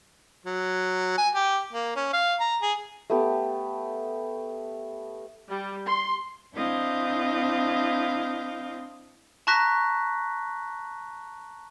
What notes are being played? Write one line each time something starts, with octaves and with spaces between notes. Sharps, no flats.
F#3
G#5
G4
A#3
C#4
F5
A#5
G#4
A3 B3 G4
G3
C6
C4 D4 E4 D#5 F5 G6
A5 A#5 C#6 F#6 A#6 B6